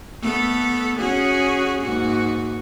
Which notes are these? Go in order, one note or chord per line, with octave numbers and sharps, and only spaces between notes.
A3 B3 A4
C#4 F#4 G#4
G#2 A#3 F#4